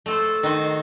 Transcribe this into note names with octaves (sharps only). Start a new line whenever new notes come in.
A3 A4 C5
D#3 F#4 C5